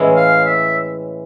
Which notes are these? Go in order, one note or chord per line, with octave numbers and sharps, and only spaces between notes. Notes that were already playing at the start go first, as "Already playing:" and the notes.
Already playing: A2 E3 G#3 C#4 E4
F5
E5